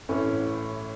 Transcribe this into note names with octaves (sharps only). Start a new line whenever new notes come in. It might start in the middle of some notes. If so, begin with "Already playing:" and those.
A1 A2 A3 C#4